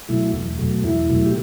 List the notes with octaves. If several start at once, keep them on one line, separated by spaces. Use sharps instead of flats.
B2 F#3 A3 E4
E2
B2 F#3 A3
E2 E4
B2 F#3 A3
G4